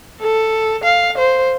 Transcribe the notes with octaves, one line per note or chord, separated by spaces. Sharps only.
A4
F5
C5